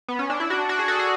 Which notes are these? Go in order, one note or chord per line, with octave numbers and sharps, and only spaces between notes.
B3
C#4
D4
E4
D4 F#4
D4 F#4
G#4
F#4 A4
G#4